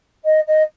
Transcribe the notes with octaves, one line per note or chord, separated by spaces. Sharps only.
D#5
D#5